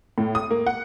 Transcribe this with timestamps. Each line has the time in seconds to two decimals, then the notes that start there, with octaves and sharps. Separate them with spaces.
0.18 A2
0.35 D#6
0.51 A#3
0.66 F#5